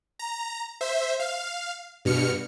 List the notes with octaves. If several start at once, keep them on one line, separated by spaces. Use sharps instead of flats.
A#5
C5 E5
F5
G2 B2 F6 C#7